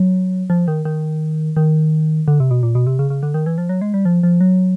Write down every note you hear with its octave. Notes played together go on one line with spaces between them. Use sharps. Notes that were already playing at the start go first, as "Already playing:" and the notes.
Already playing: F#3
F3
D#3
D#3
D#3
D3
C3
B2
A#2
B2
C3
C#3
C#3
D3
D#3
E3
F3
F#3
G#3
G3
F3
F3
F#3